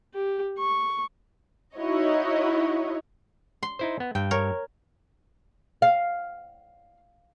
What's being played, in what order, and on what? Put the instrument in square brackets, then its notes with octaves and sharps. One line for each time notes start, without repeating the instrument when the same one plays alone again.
[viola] G4
C#6
[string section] D#4 E4 F#4 C#5 D#5
[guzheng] C6
[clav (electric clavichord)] D#4 E4 C5
B3
[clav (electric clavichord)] G2 [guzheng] G5
[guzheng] A#4 C#5
[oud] F5